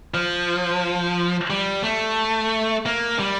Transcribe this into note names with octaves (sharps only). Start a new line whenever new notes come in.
F3
G3
A3
A#3
G3